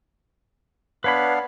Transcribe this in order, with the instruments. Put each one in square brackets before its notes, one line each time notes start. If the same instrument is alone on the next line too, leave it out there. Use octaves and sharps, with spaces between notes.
[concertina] B3 D4 F5 [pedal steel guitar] B4 C#5 B5